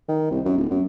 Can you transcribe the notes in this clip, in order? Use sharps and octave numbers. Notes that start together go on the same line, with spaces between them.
D#3
C2
F#2
D1
F#2